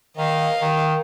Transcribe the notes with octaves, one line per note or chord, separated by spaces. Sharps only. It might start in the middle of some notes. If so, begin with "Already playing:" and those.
D#3 D#5 F5
D#3